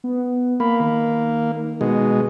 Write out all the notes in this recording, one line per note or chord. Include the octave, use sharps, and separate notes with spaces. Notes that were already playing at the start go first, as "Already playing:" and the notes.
B3
A#3 B5
D#3
B2 G#3